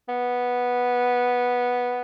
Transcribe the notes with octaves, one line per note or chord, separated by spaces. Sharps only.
B3